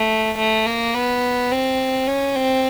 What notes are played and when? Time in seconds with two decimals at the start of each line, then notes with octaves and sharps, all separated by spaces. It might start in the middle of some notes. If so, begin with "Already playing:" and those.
Already playing: A3
0.38 A3
0.66 A#3
0.94 B3
1.51 C4
2.07 C#4
2.36 C4